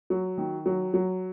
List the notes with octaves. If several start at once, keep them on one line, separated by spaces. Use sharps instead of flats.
F#3
D#3
F#3
F#3